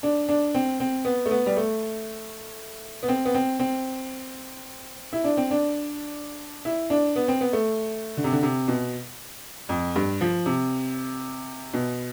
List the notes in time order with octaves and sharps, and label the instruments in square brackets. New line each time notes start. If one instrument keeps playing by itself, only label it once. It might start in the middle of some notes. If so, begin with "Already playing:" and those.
[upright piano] D4
D4
C4
C4
B3
A3
B3
G3
A3
B3
C4
B3
C4
C4
E4
D4
C4
D4
E4
D4
B3
C4
B3
A3
D3
C3
D3
C3
B2
F2
G2
F3
C3
B2